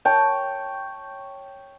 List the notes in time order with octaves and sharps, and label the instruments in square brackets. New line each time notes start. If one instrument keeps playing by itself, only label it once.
[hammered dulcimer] C#5 G5 A5